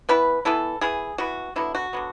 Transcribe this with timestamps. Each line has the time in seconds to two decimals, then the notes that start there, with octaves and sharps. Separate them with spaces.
0.09 E3 B3 E4 B4
0.45 E3 B3 E4 A4
0.81 E3 B3 E4 G#4
1.18 E3 B3 E4 F#4
1.56 D3 F#3 B3 E4
1.75 F#4
1.93 D3 F#3 B3